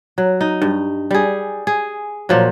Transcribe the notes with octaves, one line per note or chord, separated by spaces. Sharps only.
F#3
D#4
G2
G3 G#4
G#4
A#2 F3 F#3